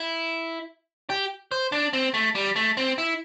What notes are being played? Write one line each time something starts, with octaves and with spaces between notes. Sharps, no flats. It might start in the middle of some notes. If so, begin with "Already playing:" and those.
Already playing: E4
G4
C5
D4
C4
A3
G3
A3
C4
E4